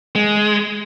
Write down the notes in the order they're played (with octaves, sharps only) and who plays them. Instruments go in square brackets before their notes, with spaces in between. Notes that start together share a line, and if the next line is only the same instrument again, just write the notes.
[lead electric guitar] G#3